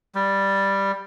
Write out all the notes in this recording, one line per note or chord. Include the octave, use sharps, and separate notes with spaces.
G3